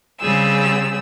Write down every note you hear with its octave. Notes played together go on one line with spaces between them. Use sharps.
C#3 G3 C4 G#4 E6